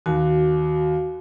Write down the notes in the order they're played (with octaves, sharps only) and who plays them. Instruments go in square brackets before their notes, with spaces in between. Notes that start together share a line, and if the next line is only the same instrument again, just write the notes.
[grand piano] D#2 [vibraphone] F#4